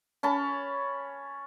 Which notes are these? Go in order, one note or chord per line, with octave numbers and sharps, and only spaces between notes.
C#4 A5 B5